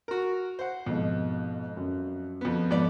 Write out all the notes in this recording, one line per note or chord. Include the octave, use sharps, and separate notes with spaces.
F#4 A#4
C5 F#5
F2 G#2 B2
F#2
F2 B3
F2 G#2 B3 D5